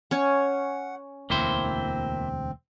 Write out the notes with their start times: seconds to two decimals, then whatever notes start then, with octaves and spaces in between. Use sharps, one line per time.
0.11 C#4 C#5 F#5
1.30 E1 D2 A#3 C4 E4 C5